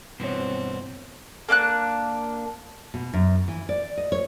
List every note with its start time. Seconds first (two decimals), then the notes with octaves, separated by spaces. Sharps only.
0.20 G2 B2 E3 C4 C#5
1.49 A#3 D4 G#5 F#6
2.94 B2
3.13 F#2
3.48 E3
3.69 D5
3.97 D#5
4.12 C#5